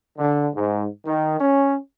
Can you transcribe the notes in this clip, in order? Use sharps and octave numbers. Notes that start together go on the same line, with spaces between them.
D3
G#2
D#3
C#4